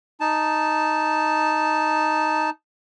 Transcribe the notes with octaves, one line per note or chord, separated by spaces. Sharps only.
D#4 A5